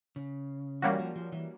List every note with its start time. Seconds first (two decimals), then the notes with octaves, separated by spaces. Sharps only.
0.16 C#3
0.82 E3 G3 A#3 C#4 F#4
0.99 F3
1.16 F3
1.32 E3